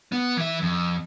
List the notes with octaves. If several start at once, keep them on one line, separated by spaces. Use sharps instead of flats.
B3
E3 E5
F2